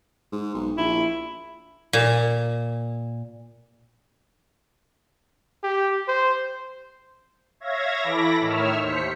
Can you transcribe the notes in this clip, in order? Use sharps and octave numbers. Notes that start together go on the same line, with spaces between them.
G#2
B1
A#1 E4
A#2
G4
C5
C#5 E5 F5 G#6 A#6
E3 E4 A4 B5 D6 A#6
A2 D#3 C#5 E5 E6 F6
D#2 C5 B6 C#7